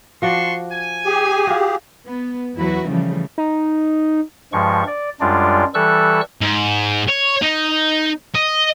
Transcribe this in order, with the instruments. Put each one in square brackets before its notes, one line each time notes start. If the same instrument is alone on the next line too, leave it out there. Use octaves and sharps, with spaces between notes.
[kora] F3 F#4 D5 [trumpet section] D4 C6 C#6
[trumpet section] G#5
[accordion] G4 G#4
[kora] F4 F#4
[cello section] B3
E2 F#3 E4 F#4 B4
C#3 E3 F3 G3 A3
[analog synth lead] D#4
[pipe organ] G2 F3 G#3 C#6
D5
F#2 G3 G#3 D4 F4 D5
E3 G3 A4 C#6 E6 F#6
[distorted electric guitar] G#2
C#5
D#4
D#5